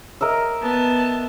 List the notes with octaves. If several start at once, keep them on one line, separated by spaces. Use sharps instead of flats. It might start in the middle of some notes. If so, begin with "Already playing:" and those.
A#4 D#5 E5
B3 A5